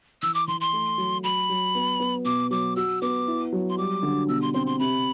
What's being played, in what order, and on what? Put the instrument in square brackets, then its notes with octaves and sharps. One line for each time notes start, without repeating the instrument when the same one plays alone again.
[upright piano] E3 [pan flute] E6
[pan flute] D6
[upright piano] E3 [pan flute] C6
[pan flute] C6
[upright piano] A3
F#3
[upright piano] F#3 [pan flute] B5
[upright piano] F#3
B3
B3
[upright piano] B2 [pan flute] D6
[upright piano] F#3 [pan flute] D6
[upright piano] F#4 [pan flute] E6
[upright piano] B3 [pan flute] D6
[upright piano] E4
F#3
[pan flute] C6
[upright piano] G3 [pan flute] D6
[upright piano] D3
[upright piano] B2 [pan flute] E6
[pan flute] C6
[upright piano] C4 [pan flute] C6
[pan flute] C6
[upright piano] C3 [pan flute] B5